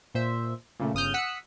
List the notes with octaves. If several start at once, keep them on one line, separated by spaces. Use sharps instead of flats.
A#2 C5 E5
A#2 C#3 A3
G1 C#3 D#6 F6 G6
F#5 D#6 E6 F#6 B6 C#7